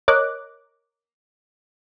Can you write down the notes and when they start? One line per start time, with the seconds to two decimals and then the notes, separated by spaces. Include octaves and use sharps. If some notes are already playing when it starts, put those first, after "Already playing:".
0.08 A#4 C#5 D#5 D6 F#6